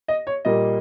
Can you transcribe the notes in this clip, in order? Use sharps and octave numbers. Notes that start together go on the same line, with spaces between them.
D#5
C#5
A#2 G3 A#3 D#5